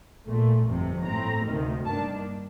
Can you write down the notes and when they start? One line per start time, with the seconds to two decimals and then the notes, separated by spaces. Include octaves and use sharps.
0.27 A#1 A#2 A3
0.66 G1 F2 C3
1.06 A2 A3 C4 A#5
1.46 D2 C3 D#3 A3
1.85 G2 D#3 A#3 D4 A5